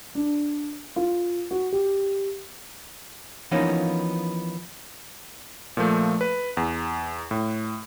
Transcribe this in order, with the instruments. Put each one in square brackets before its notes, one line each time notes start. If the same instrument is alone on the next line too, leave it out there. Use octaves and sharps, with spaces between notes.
[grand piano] D4
F4
F#4
G4
[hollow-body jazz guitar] E3 F3 A#3 B3 C#4 D#4
[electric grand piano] A#2 F3 A3
B4
E2
A2